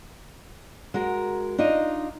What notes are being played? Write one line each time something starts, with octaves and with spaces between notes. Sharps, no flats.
G#3 F#4 A#4
D4 D#4 F4 D#5